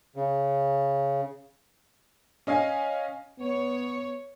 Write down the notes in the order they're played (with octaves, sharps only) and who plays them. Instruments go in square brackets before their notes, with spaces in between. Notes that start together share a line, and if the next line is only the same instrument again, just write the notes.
[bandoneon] C#3
[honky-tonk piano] C#4 D#5 F5 G#5
[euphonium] B3 [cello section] C#5